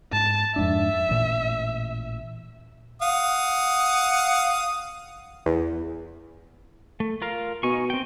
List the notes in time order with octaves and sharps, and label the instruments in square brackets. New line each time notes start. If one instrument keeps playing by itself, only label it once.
[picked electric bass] G#2 [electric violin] A5
[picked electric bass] F2 G#2 D4 [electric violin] E5
[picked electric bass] A1 A#2
[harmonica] F5 F#5 D#6
[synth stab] E2
[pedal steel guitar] A3
F4 A#4 F5
[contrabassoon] B2 [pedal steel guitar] D#4 G#5 C#6
[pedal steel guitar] C4 G5